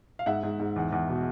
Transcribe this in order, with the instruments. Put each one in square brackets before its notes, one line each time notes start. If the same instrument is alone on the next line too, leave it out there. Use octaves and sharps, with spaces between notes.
[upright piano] F5
G#2 E5 F#5
G#2
G#2
E2
E2
B2